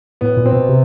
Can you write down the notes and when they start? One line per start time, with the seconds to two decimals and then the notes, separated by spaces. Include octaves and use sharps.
0.21 A2 B3
0.37 A#2
0.46 C4
0.53 B2
0.69 C3